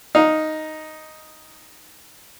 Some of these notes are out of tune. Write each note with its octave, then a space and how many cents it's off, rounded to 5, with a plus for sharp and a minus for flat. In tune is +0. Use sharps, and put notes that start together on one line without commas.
D#4 +0 F5 +25